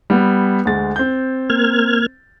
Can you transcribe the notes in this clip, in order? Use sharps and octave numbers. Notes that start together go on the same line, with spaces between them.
G3 B3
D2 G#3 A6
C4 G6
A#3 F6 G#6